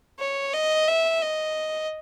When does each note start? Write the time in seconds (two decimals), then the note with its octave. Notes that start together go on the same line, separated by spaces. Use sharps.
0.19 C#5
0.53 D#5
0.87 E5
1.21 D#5